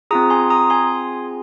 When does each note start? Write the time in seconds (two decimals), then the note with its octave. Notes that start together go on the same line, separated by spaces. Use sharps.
0.11 C4 F4 G#4 A#5 D#6
0.30 G#5 C6
0.50 A#5 D#6
0.70 G#5 C6